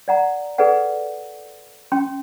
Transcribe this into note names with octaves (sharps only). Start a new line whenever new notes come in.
D5 F#5 A#5
G#4 A4 B4 D5 F#5
C#4 G5 C6